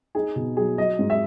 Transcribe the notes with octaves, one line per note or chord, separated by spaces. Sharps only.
D#4 G#4
B2
F#3 G#4
F#3 D#5
G#2
E5